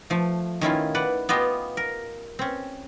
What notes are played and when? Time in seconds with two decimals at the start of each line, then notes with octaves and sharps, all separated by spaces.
0.10 F3 A3
0.61 D#3 C#4 E4 F4
0.95 B4 D5 F#5
1.29 B3 F4 G4 D#5
1.77 A#4
2.39 C4 C#4